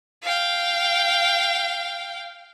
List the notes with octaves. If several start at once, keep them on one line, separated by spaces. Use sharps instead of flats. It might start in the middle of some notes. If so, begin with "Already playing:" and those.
F5 G5